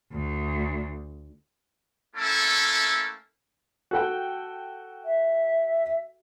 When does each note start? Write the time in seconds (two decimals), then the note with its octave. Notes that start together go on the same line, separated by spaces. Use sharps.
0.12 D2
2.15 A3 A#3 C#4 E4 A4
3.91 F#4 A4 G5
5.05 E5